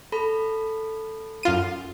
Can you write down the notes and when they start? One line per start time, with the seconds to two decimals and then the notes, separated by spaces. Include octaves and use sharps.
0.12 A4 B5
1.43 F#2 F4 D#7